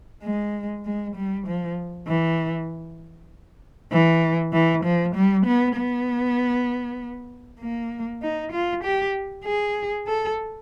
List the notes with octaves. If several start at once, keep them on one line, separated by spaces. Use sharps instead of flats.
G#3
G#3
G3
F3
E3
E3
E3
F3
G3
B3
B3
A#3
D#4
F4
G4
G#4
A4